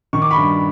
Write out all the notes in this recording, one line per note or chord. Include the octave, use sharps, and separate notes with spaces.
D#3 C#6
D6
B5 C#6
G2